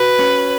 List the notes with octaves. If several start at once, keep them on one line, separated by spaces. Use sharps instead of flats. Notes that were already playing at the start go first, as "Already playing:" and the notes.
Already playing: F#4 B4
C#4